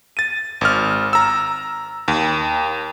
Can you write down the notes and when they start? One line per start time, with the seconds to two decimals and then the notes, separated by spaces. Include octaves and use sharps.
0.17 A6 D#7
0.61 G#1 F6
1.13 A#5 E6
2.08 D#2